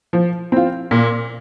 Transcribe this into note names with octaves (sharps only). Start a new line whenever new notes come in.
F3
C4 F4
A#2